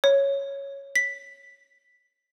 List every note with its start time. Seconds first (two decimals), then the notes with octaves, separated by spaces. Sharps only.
0.04 C#5
0.96 B6